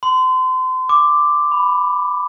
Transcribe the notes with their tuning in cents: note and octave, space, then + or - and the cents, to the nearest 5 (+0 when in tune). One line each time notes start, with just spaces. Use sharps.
C6 -35
D6 +5
B5 +10